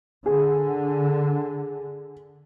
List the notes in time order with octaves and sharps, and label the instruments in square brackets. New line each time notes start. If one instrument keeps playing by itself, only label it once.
[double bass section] D3 [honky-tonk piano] G#4